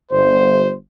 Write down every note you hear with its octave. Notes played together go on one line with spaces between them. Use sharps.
G1 C5